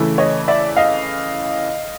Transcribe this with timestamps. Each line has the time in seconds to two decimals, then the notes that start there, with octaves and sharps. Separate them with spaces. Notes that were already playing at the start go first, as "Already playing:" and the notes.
Already playing: C#3 E3 A3
0.18 C#5 D#5
0.48 D5 E5
0.76 D#5 F5